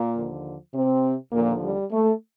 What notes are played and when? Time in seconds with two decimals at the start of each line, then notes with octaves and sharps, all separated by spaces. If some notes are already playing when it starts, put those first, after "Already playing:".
Already playing: A#2 A#3
0.14 D#2 D3 F3
0.74 C3 C4
1.32 D#2 A#2 D3 F3 A#3
1.62 G3
1.91 A3